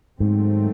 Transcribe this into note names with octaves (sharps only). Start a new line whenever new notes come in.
G#2 D#3 F#3 A3 C4